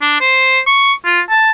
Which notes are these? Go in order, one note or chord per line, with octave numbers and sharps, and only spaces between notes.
D4
C5
C#6
F4
A5